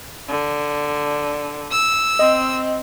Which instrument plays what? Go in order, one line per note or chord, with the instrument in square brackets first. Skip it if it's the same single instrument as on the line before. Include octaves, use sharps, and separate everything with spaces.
[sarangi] D3
[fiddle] E6
[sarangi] C4 [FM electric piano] D#5